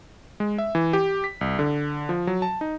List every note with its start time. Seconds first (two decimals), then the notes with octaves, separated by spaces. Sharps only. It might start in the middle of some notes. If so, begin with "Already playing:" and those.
0.40 G#3
0.58 E5
0.75 E3
0.93 G4
1.24 B6
1.41 C2
1.59 D3
2.09 F3
2.27 F#3
2.42 A5
2.61 D#4